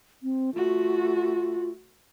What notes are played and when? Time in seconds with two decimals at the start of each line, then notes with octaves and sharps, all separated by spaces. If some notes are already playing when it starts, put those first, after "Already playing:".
0.23 C4
0.55 A3 F4 F#4